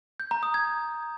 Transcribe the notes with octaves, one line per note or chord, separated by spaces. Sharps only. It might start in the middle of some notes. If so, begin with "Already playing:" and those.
G6
A#5
D#6
G#6